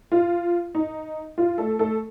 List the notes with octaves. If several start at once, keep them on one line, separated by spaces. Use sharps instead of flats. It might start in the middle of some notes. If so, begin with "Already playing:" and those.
F4
D#4
F4
A3 A4
A3 A4